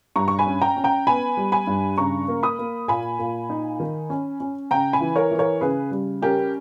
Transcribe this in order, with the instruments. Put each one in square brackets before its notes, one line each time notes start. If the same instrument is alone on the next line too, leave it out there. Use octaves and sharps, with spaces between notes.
[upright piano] G2 A#5 C#6
C#6
G#5 B5
C#4
G5 A#5
C#4
G5 A#5
B3 G#5 B5
G3
G#5 B5
G2
C#3 A#5 C#6
A#3
B5 D#6
A#3
A#2 G#5 B5
A#2
D#4
D#3
C#4
C#4
C#3 G5 A#5
G#5 B5
E3
A#4 C#5
E3
A#4 C#5
C#3 G#4 B4
G3
C#4 G4 A#4